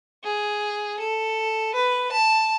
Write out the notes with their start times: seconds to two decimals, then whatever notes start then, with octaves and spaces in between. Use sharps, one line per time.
0.24 G#4
0.99 A4
1.74 B4
2.12 A5